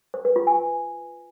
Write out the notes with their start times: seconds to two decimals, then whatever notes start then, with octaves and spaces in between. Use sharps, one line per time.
0.14 C5
0.25 B4
0.36 F4
0.47 G#5